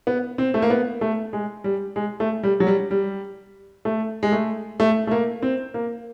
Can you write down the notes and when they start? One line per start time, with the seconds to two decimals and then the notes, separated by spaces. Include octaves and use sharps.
0.07 B3
0.38 C4
0.54 A3
0.62 A#3
0.70 B3
1.01 A3
1.33 G#3
1.64 G3
1.96 G#3
2.20 A3
2.43 G3
2.60 F#3
2.67 G3
2.91 G3
3.85 A3
4.23 G#3
4.32 A3
4.80 A3
5.07 A3
5.11 A#3
5.42 C4
5.74 A#3